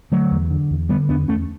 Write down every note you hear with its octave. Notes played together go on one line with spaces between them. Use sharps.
D3 F#3 A3
E2
D3
E2
D3 G3 B3
E2 B3 D4
E2 A3 C#4